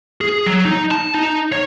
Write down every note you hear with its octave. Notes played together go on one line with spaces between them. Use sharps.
G#4
F#3
D#4
A5
D#4
C#5